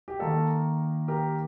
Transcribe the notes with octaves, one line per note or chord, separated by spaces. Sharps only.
G4
D#3 A#3 D#4 A4
G4 A#4